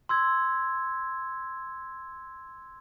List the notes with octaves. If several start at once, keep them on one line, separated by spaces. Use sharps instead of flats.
C6 E6 G#6